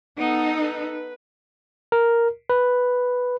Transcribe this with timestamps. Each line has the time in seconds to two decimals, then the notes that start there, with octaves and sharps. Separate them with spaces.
0.17 B3 D#4 A4
0.57 B4
1.92 A#4
2.50 B4